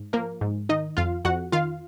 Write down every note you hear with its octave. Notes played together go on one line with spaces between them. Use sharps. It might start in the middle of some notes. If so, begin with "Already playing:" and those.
Already playing: G#2
F3 A#3 A#4
G#2
D#3 D#4 D#5
F2 F4 F5
F2 F#4 F#5
D#3 F4 F5